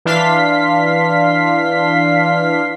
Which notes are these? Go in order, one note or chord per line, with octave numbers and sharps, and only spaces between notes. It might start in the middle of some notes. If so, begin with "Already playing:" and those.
E3 D4 F5 C6 B6